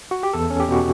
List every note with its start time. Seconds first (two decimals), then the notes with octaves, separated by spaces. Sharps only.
0.11 F#4
0.23 G4
0.33 E2 A4
0.50 C#4
0.60 G4
0.68 B2 F#4